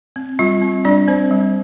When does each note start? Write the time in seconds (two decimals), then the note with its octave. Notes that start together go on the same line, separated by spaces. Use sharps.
0.16 C4
0.39 G3 F4
0.62 C4
0.85 G3 D4 D5
1.08 C4 C5
1.31 G3